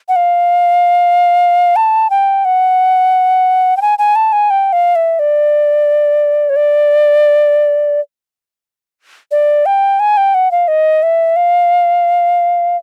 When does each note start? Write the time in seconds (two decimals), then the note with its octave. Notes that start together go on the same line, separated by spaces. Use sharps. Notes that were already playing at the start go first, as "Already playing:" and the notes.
0.09 F#5
0.16 F5
1.76 A5
2.10 G5
2.45 F#5
3.77 G5
3.82 G#5
3.99 G#5
4.16 A5
4.33 G#5
4.50 G5
4.73 F5
4.96 E5
5.19 D5
6.50 C#5
6.56 D5
9.31 D5
9.66 G5
10.00 G#5
10.17 G5
10.34 F#5
10.51 F5
10.68 D#5
11.03 E5
11.36 F5